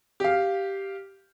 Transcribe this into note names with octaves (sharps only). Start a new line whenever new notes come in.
G4 F5